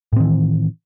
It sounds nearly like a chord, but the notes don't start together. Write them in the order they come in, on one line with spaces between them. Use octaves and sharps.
A2 C4 D#3 E3